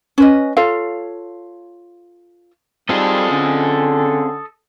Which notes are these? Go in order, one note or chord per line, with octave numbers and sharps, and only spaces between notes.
C#4 B4 D#5
F4 A4 C#5 F5
G3 C4 D#4 F4 G#4 A4 D#5
D3 C#4